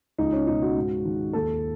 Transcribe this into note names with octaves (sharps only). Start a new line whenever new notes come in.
C#2 D#4
C#4
B2 D#4
F#4
G#2
D#3
D#2 A4